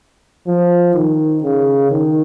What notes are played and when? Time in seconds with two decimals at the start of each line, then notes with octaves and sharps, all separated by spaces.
0.47 F3
0.94 D#3
1.43 C#3
1.91 D#3